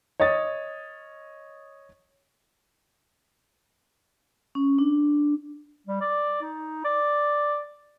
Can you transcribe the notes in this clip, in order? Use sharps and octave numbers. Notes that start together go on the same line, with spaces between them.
C#5 D#5 D#6 A6
C#4
D4
G3
D5
D#4
D5